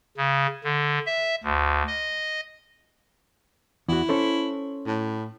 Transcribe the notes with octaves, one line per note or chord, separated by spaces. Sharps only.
C#3
D3
E5
D2
D#5
E2 E4 F#4
C#4 A4 C5
A2